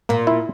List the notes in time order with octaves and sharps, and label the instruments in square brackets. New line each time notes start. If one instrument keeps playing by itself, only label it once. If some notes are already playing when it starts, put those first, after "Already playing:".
[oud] A#2 [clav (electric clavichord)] A#3
[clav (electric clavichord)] E4